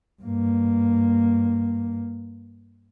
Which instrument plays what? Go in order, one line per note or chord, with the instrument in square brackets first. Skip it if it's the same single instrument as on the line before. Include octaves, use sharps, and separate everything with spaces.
[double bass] G2 A#3